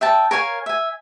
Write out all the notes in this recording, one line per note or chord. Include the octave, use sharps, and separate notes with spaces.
E5 G5 A5
A#4 C#5 F5 G#5
E5 G#5